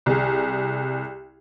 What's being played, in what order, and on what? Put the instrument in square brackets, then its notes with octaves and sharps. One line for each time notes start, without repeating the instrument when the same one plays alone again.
[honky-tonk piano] C2 G#4